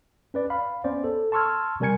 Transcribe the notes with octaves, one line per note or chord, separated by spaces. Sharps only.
C#4 B4 D5
F5 B5
B3 C#4 C5 D5
A4
A5 C6 C#6 E6 F6 G#6
C3 G3 A#4 G#5 G#6 C#7